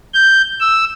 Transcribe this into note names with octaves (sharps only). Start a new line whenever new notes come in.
G6
E6